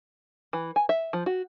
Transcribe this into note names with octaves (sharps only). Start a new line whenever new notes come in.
E3
G#5
E5
F3
F#4